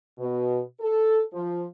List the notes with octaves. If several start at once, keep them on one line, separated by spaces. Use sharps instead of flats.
B2
A4
F3